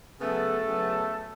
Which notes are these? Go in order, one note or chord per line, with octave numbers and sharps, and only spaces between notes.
C#3 F#3 A3 B3 A4
C#3 F#3 B3